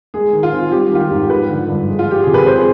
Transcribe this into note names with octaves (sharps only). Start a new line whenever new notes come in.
G#3 G#4
D#3
F4
C4
G3 G4
D#3 F4
G4
G#2
F3 B4
D3
G2
G#3
F4
F3 G4
C3 G#4
B4
C4 C5
G#4